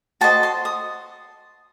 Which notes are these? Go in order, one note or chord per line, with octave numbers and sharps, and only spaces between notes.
F#4 C5 D#5 A5
C6
D#6